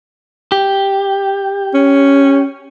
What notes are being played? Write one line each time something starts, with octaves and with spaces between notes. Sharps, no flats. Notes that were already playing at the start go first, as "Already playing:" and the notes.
G4
C#4